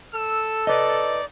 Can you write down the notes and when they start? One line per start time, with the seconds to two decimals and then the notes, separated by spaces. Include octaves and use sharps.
0.14 A4 E6
0.67 D#4 B4 D5 D#5